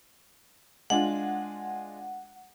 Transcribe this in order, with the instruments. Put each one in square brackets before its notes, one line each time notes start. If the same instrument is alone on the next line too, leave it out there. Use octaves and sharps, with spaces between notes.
[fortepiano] G#3 D4 F4 [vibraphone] F#5